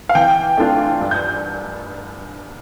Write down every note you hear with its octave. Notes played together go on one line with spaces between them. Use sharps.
F5
E3 G5
A3 D4 F4
G2
G6